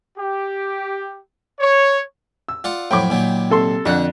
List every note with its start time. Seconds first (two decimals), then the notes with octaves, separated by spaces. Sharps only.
0.17 G4
1.60 C#5
2.48 E6
2.64 F4 D5 F#5
2.91 F2 A2 F#3 G5 B5 D6
3.10 A#2 D#3 F#3
3.50 C3 A4 C6
3.86 F2 D3 D4 F#5 F#6